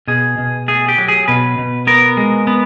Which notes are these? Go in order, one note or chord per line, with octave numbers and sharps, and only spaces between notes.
B2 G#4
B2
A3 G#4
G4
F#3
G#4
B2 B4
B2
B3 A#4
G#3
B3